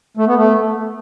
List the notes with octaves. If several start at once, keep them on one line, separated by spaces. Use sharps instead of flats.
A3
B3
A3